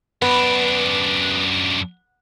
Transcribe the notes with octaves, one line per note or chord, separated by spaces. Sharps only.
F#2 B3 D4